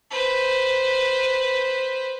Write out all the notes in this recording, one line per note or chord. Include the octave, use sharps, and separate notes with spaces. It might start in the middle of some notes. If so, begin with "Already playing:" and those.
B4 C5